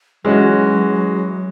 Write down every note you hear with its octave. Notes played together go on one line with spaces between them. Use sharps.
E3 F#3 G#3 C#4 F#4